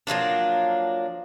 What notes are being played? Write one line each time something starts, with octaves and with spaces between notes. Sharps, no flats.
F3 F#3 A#3 D4